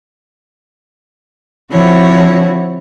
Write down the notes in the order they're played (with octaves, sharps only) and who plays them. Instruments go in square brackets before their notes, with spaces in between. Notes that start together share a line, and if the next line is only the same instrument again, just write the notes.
[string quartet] D3 F3 C4 E4 F#4 C#5